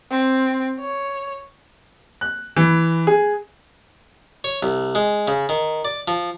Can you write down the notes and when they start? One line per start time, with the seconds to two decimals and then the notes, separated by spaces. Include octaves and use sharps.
0.11 C4
0.79 C#5
2.21 F#6
2.56 E3
3.07 G#4
4.44 C#5
4.63 C2
4.95 G#3
5.28 C#3
5.49 D#3
5.85 D5
6.08 F3